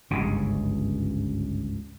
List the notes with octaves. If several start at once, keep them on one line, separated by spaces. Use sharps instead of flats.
G1 C#2 G#2 C#3